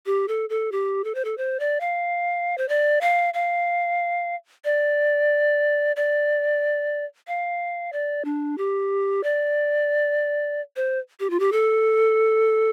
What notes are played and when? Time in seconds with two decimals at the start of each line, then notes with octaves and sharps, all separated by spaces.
0.06 G4
0.28 A4
0.50 A4
0.72 G4
1.04 A4
1.15 C5
1.25 A4
1.38 C5
1.60 D5
1.80 F5
2.58 C5
2.69 D5
3.01 F5
3.34 F5
4.65 D5
5.96 D5
7.27 F5
7.93 D5
8.25 D4
8.58 G4
9.23 D5
10.76 C5
11.20 G4
11.30 F4
11.40 G4
11.52 A4